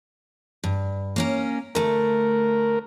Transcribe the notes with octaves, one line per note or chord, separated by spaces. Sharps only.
G2
A#3 C#4 A#4
D2 A3 A#4